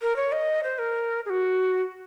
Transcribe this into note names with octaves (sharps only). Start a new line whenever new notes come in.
A#4
C#5
D#5
C5
A#4
G#4
F#4